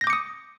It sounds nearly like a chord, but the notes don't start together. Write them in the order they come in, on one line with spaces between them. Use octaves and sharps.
A#6 G6 D6 C#7 D#6